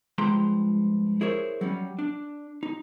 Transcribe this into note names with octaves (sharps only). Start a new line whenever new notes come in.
G2 F3 G#3 G5 A#5 C6
E4 G#4 A#4 C5 C#5
F#3 G3 C#4
D4
D#4